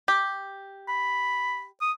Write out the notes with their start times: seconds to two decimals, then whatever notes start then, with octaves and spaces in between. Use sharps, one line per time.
0.08 G4
0.88 B5
1.82 D#6